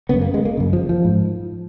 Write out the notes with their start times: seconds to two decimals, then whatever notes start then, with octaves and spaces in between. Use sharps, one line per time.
0.09 F#2 C#3 B3
0.21 A#3
0.34 G#3
0.45 A#3
0.57 F#2 C#3
0.73 F3
0.89 F3
1.05 G#2